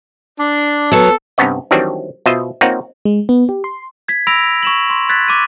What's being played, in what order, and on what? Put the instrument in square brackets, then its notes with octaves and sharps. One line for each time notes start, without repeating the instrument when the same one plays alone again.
[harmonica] D4
[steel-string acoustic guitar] F#3 B3 [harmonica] A4
[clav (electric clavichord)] G2 C3 B3 C#4 C#5 D#5
D#3 E3 F#3 G3 C4 D4
B2 F4 C5 D#5 E5
A#3 C4 D#4 F4 C#5 F#5
[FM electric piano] G#3
B3
G4
C6
[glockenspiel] G#6 B6
B5 E6 A#6 D7 F7
C#6 E7 F#7
C6
F#6 G#6 A6 B6
D6 D#7